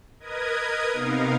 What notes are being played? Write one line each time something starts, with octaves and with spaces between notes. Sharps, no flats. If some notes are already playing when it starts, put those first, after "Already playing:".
A#4 B4 D#5 D#6 G#6
C3 B3 D#4 A#4 F5